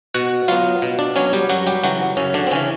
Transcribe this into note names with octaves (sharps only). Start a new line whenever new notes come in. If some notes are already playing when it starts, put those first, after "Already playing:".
B2 F#4 F#5
F#3 B3 F4 F5
B2
D4 D5
F#3 B3 C#4 C#5
G3 G4
F#2 F#3 F#4
G3 G4
C#3 E3 F#3 F#4
F#2 C#3 C#4
D3 D4
C4
C#3 E3 C#4